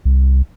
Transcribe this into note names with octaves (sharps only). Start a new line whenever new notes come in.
C2